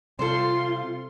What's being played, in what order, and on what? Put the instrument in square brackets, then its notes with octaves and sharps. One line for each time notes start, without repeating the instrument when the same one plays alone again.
[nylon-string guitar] C3 G3 [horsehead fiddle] F4 [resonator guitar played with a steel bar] A4 C5 [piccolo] C6